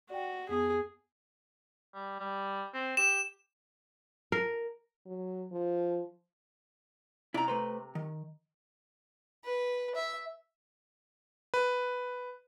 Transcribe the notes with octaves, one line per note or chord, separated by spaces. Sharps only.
F#4 D5 G5
F2 B3 G#4 D#6
G3
G3
C4
G4 E7
A#4
F#3
F3
C3 E4 D5 A#5
A3 B4 C5
D#3
B4
E5
B4